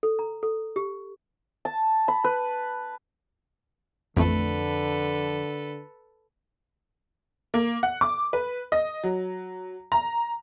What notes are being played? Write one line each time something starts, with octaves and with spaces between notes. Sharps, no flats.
A4
A#5
A4
G4
A5
B5
B4
A1 F2 D3 A3 A4 B4
A#3
F#5
D6
B4
D#5
F#3
A#5